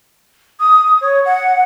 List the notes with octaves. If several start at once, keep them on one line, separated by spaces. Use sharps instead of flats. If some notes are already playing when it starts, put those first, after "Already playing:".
D#6
C#5
F#5